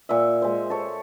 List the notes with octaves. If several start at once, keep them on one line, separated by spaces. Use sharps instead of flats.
A#2 E5
G#3 C5
A4 C#5